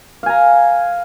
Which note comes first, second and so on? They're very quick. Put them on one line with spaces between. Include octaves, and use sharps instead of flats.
F5 G#5 A#5